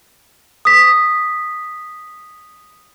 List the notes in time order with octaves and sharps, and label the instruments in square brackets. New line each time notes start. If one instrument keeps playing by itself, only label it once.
[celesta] D#6 B6